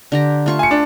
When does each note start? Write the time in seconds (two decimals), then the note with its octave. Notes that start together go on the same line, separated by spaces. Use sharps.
0.12 D3 G4 A#5
0.46 A3 F4 C#6
0.59 G#5 C#7
0.71 D4